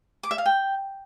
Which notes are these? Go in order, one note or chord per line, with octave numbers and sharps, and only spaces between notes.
D6
E5
F5
G5